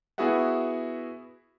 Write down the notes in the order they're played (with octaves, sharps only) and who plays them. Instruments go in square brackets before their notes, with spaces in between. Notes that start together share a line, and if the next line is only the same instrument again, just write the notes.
[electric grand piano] B3 E4 F#4 G#4 E5 F#5